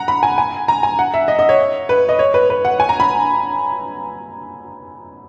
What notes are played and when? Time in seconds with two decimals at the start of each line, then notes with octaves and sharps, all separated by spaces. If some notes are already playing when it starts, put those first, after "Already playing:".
Already playing: F#5 A#5
0.08 B5
0.23 G#5
0.38 G#5
0.68 A#5
0.83 G#5
0.99 F#5
1.14 E5
1.28 D#5
1.39 D#5
1.49 C#5
1.89 B4
2.09 D#5
2.19 C#5
2.34 B4
2.50 B4
2.65 F#5
2.80 G#5
2.89 A#5
3.00 B5